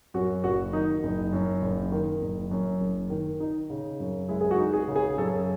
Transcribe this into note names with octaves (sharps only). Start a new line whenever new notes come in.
F#2 F#4
F#1 F#4
D#3 D#4
F#1
F#2
F#1
D#3
F#1
F#2
F#1
D#3
D#4
C#3
F#2
G#3 E4
G#4
F#4
D#4
G#4
C#3
G#4
F#2 A4